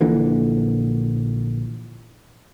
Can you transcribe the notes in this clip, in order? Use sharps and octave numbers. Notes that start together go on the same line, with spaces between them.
A#1 A#2 D3 E3